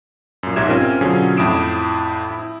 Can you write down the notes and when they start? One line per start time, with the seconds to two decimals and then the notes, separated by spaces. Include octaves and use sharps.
0.43 F#2 A#2
0.56 B1 G#2 G4 E5 G#6 E7
0.69 C4 C#4 F4 A#4
1.01 B2 D3 F#3 C#4 F4 G#4
1.37 F2 A2 E4 D#6 D7 E7
2.31 E4